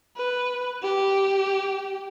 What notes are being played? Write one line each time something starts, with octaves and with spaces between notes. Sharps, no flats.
B4
G4